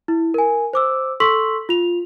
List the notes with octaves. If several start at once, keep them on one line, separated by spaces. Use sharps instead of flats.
E4
A#4 G#5
C5 D6 E6
A4 C6 C#6 E6 B6 F#7
F4 F7